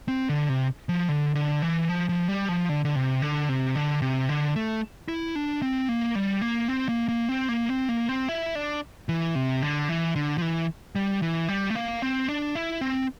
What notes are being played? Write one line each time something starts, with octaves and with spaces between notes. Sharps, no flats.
C4
D3
C3
F3
D3
D3
E3
F3
F3
G3
F3
D3
D3
C3
D3
C3
D3
C3
D3
A3
E4
D4
C4
A#3
G3
A#3
C4
A#3
A#3
C4
A#3
C4
A#3
C4
E4
D4
E3
C3
D3
E3
D3
F3
E3
G3
E3
G3
A3
A#3
C4
D4
E4
C4